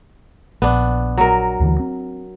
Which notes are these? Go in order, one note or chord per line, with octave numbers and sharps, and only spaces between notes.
A#1 B3 D4
F#3 A#4
D2 D3 E3
C4